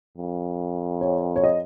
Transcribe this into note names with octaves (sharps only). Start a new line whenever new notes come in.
F2
C#5
C#5
D#5